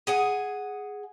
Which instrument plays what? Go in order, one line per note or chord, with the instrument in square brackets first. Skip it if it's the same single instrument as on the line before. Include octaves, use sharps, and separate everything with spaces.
[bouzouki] G#4 F#5 G#5